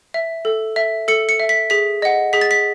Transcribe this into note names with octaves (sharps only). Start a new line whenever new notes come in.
E5
A4
E5
A4 C#7
C#7
E5
B6
G#4 B6
D#5 F#5
G#4 B6
A6
B6